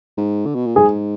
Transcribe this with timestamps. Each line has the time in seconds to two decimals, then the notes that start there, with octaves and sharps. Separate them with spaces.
0.17 G#2
0.46 D3
0.55 B2
0.66 A#2
0.76 G#2 G#4